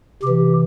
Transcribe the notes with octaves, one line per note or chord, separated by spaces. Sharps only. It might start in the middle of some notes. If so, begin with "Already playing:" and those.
C3 E3 G4